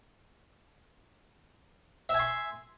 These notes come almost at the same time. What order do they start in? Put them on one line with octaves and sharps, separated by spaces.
E5 G#5 C6